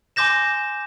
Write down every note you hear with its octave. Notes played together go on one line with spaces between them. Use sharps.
G#5 C6 D6 G6 A#6 E7